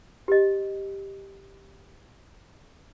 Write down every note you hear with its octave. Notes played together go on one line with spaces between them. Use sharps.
G4 D#5